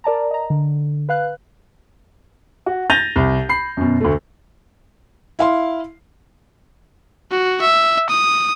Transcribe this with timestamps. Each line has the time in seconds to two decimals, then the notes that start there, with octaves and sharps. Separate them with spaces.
0.04 A#4 D5 A5 A#5
0.31 D#5 A#5
0.50 D3
1.09 B4 F5 F#6
2.66 F#4
2.90 G6 A6 A#6 D#7 F7 G7
3.16 C2
3.49 B5 C7
3.77 F#2 B2
4.01 D2 A3
5.39 E4 F5 C6
7.31 F#4
7.61 E5
8.09 D#6